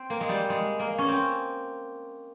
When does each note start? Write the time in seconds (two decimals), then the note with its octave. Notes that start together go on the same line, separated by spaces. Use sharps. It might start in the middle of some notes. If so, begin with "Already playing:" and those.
Already playing: C4
0.10 A#3
0.21 G#3
0.29 G3
0.50 G#3
0.79 A#3
0.98 C#4
1.08 C4